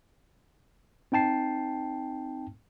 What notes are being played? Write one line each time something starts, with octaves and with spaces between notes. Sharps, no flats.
C4 D#4 G5 A5 C7